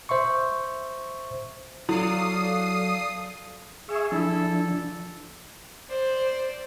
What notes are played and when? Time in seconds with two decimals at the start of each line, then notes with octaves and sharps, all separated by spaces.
0.09 C5 E5 C6 C#6
1.89 F#3 E4 A4 D5 F5 D#6 C7 D#7
3.89 G#4 E5 C#6 E6
4.12 F3 D4 E4 A4
5.89 C5 D5